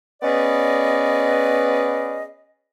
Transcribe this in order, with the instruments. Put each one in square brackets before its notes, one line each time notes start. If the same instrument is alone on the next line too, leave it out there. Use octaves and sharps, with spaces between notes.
[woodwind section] B3 C#4 G#4 B4 D5 D#5